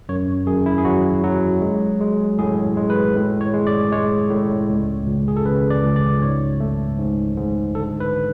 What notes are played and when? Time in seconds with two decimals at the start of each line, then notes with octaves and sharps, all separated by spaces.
0.09 F#2 C#5
0.47 F#2 G#4
0.66 E4
0.78 G#4
0.85 F#3 F#4
1.24 F#3
1.62 G#3
2.00 G#3
2.39 A2 G#4
2.77 G#3
2.90 B4
3.16 A2
3.41 C#5
3.54 G#3
3.67 D5
3.92 G#3 C#5
4.30 A2
4.69 C#2
5.07 C#2
5.28 G#4
5.37 A4
5.45 C#3 B4
5.70 D5
5.84 C#2
5.96 D5
6.21 G#2 C#5
6.60 A3
6.98 G#2
7.37 G#2
7.75 D3 A4
8.00 B4